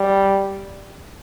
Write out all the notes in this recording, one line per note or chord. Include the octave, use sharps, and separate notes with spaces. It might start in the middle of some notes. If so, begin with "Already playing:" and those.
Already playing: G3